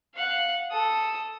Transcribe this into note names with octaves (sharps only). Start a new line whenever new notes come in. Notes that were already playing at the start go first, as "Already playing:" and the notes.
F5 F#5
A4 D#6